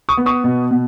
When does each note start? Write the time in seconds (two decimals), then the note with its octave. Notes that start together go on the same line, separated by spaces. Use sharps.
0.09 C#6 D#6
0.17 B3
0.26 C#6 D#6
0.44 B2
0.71 B2